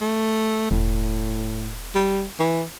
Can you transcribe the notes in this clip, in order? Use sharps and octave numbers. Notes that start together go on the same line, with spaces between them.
A3
E1 A2
G3
E3